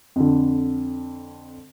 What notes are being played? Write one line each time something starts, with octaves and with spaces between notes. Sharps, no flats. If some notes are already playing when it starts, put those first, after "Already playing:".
F2 D3